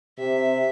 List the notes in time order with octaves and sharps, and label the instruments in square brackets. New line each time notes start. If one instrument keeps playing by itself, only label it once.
[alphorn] C3 [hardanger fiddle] E5